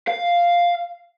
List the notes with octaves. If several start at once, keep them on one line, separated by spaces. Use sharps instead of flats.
F5